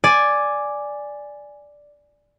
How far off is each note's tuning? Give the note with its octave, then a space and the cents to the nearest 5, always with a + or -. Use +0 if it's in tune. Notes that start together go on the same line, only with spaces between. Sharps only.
D5 +0 G#5 +0